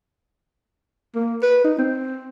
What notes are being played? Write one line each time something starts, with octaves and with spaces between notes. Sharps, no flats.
A#3
B4
D#4
C4